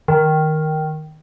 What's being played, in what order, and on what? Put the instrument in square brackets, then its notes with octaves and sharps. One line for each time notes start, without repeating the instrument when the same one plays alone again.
[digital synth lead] D#3